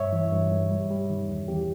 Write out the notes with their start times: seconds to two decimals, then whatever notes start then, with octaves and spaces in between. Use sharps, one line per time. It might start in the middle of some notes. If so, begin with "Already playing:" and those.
Already playing: G2 C#5 E5
0.13 E3
0.32 G2
0.51 G2
0.71 G3
0.91 G3
1.10 D#3
1.28 E2
1.48 E2 G4